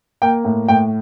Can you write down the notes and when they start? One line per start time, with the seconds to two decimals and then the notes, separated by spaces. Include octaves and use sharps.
0.22 A#3 G5
0.44 A2
0.68 A2 G5